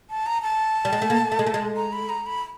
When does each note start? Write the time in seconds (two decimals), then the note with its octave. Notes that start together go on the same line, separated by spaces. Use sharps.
0.10 A5
0.26 A#5
0.43 A5
0.85 G3
0.93 G#3
1.02 A3
1.10 A#3
1.32 A3
1.39 G#3
1.47 A3
1.54 G#3
1.76 A#5
1.92 B5
2.09 A#5
2.26 B5